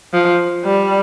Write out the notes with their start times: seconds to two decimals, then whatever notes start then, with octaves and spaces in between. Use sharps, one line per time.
0.14 F3
0.65 G3